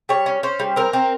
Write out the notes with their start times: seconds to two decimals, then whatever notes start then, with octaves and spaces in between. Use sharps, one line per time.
0.09 G3 C#5
0.26 C#4
0.43 C#4 C5
0.59 G3
0.76 C4 A#4
0.93 C4